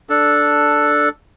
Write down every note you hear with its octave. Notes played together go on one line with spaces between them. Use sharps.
D4 A4